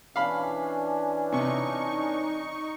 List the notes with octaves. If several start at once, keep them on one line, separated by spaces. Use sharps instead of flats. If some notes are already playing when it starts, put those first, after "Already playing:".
E3 C#4 D4 F5 B5
C3 D#4 C#6